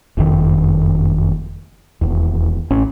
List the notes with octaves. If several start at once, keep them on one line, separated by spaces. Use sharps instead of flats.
F#1 F2 D#3
D#1 E2
A1 C#4